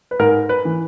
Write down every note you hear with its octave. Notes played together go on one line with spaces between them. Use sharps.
B4
G#2 A#4
B4
E3